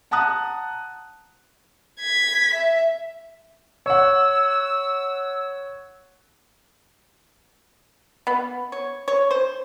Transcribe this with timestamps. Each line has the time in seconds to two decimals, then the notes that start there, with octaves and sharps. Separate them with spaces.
0.11 F#5 A5 A#5 D#6 F#6
2.00 G#6 B6
2.54 E5
3.86 C#5 F#5 E6
8.27 B3
8.72 C#5
9.08 C#5
9.31 C5